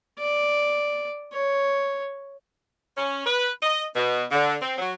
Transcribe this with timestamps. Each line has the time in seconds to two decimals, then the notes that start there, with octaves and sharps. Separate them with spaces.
0.19 D5
1.33 C#5
2.97 C#4
3.26 B4
3.63 D#5
3.95 B2
4.31 D3
4.62 C4
4.78 F#3